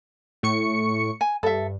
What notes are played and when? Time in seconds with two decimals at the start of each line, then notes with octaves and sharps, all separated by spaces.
0.43 A2 C#6 C#7
1.21 G#5
1.43 G2 A4 E5